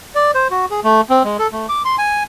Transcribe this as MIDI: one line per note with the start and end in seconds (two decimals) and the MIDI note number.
0.15 0.31 74
0.34 0.48 72
0.51 0.66 66
0.70 0.80 68
0.84 1.01 57
1.09 1.23 60
1.24 1.37 56
1.39 1.47 69
1.52 1.66 57
1.69 1.82 86
1.85 1.96 84
1.98 2.23 80